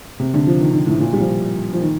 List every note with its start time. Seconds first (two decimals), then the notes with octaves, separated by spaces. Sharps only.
0.20 C3
0.34 D3
0.47 F3
0.60 D#3
0.73 D3
0.86 A2
1.00 A#2
1.13 G3
1.20 F3
1.73 F3
1.81 D#3